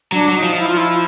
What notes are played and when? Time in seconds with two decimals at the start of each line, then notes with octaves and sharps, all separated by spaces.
0.12 F#3 D4
0.28 F#3
0.36 D#4
0.43 F3
0.59 E4
0.68 F4
0.77 E4